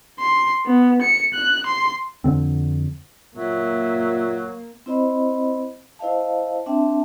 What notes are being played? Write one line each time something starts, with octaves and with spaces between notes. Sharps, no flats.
C6
B3
C#7
F#6
C6
F2 D3 C4
A#2 F#3 A#3 E5
C4 E4 C5 D#5 B5
E4 C5 D#5 F5 A5
C4 D4 E5 G5 A5